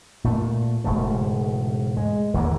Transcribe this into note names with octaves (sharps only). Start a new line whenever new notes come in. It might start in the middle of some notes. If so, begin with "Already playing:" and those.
A#2 A3
E1 G#2 C#3 A3
G#3
D#2 D3 A#3